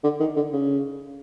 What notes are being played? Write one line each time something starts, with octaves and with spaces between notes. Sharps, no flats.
D3
D#3
D3
C#3